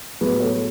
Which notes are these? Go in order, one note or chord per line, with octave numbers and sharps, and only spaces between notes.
A2 F#3 B3 G#4 B4
A4 C#5